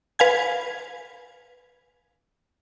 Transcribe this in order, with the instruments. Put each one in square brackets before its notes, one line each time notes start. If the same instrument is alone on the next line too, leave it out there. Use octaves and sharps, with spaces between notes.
[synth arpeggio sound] B4 F5 G#5 G#6